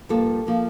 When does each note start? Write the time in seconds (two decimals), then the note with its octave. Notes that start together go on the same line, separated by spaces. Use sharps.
0.09 G2 F3 A#3 A4
0.47 F3 A#3